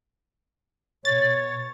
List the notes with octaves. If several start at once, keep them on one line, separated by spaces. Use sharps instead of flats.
B2 C#5 A6